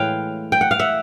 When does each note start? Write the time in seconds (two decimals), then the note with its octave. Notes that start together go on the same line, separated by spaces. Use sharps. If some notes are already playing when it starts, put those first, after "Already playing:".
Already playing: A2 E3 G#3 B4 C#5 F5 G5
0.52 G5
0.61 F#5
0.71 F5
0.79 E5 F#5